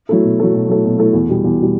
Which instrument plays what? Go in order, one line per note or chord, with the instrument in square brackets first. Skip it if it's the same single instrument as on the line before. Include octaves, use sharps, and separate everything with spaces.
[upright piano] F#3 A3 E4 A4
B2
F#3 A3 E4 A4
B2
F#3 A3 E4 A4
B2
F#3 A3 E4 A4
E2
B2 G3
E2
B2 G3